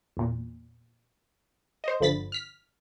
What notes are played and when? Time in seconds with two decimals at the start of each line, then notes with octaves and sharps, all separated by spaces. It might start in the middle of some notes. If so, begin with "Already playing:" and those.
0.17 E2 A#2
1.84 C5 D#5
2.00 G1 D3 F3 B5 A6 B6
2.32 F6 B6